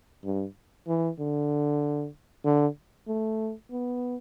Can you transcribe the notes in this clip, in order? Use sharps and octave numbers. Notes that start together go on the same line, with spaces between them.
G2
E3
D3
D3
A3
B3